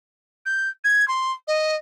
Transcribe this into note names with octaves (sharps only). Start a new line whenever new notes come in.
G6
G#6
C6
D#5